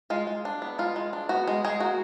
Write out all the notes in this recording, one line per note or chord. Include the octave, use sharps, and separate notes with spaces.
G#3 F4
G#3
D4
B3
G#3 F4
G#3
D4
B3 F#4
G#3
G#3 G#4
A#3 F#4